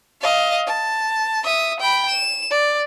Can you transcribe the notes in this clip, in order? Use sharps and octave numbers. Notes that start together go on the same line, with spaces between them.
D#5 F5
A5
E5 D#6
G5 B5
E7
D5